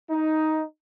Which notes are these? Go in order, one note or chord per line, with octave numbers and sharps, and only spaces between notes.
D#4